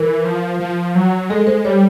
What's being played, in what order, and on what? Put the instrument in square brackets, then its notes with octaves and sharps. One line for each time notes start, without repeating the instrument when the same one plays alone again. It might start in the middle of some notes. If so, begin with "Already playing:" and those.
Already playing: [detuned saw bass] E3 [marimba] A#4
[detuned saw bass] F3
F3
F#3
[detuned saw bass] G#3 [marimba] A4
[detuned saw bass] G#3 [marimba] C5
[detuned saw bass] G3 [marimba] C#5